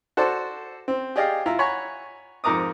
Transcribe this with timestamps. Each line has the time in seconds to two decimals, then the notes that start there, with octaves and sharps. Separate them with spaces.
0.17 F#4 A4 C5 D5 A5
0.88 C4
1.16 G4 G#4 D5 D#5 F5 G5
1.46 E4 F4 A#5
1.59 C#5 F#5 G#5 A#5 B5 C#6
2.44 F2 G#2 A#4 A#5 D6 D#6